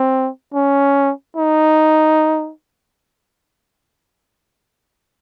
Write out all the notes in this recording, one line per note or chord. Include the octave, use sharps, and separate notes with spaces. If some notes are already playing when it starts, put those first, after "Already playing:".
Already playing: C4
C#4
D#4